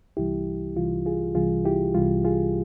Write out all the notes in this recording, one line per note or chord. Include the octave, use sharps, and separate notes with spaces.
C2 C3 E3 G3 E4 G4
C2 C3 E3 G3 F4
F4 G#4
C2 C3 E3 G3 F4 G#4
E4 G4
C2 C3 E3 G3 F4
F4 G#4